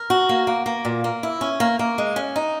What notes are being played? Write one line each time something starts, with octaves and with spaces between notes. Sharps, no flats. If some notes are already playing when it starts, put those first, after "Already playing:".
Already playing: A#4
F#4
A#3
A#3
A#3
A#2
A#3
E4
C#4
A#3
A#3
G#3
C#4
D#4